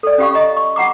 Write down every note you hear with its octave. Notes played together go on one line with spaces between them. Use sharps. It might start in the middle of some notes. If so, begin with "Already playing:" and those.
A4 D5
C#4 F4 G4 F5 C#6
D#5 A#5
C#6
F4 F#5 A#5 D6